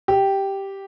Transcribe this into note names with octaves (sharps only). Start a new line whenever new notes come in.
G4